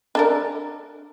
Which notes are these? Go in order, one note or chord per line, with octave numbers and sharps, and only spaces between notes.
D4 A4 A#4